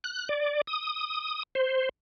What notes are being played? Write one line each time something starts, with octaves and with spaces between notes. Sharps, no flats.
F#6
D5
D#6
C5